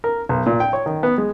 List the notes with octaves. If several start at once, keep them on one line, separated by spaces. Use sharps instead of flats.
A#4
B1
A#2
G5
C#5
D#3
B3
G#3